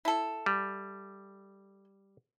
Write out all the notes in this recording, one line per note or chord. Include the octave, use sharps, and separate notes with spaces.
E4 A4
G3